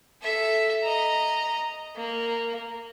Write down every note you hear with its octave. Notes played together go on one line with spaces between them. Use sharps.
A4 E5
D#5 A#5
A#3